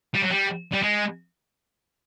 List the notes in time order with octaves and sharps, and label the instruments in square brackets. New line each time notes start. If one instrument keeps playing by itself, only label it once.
[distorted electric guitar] G3
F#3
G3
G3
G#3